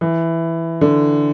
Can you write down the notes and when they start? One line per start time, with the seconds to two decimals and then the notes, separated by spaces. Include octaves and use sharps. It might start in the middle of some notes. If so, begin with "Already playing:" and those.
0.01 E3
0.81 D3